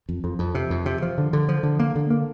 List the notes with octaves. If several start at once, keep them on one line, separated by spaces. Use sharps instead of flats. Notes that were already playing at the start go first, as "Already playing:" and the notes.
F2
F2
F2
C3
F2
C3
F3
D3
D3
F3
D3
A#3
D3
A#3